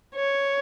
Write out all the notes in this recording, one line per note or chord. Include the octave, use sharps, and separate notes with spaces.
C#5